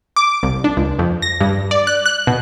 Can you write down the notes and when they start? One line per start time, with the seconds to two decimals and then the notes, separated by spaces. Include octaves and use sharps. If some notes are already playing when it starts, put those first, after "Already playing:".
0.16 D6
0.43 C2
0.64 D4
0.77 C#2
0.99 F2
1.22 A#6
1.40 G2
1.71 D5
1.87 F#6
2.06 F#6
2.27 B2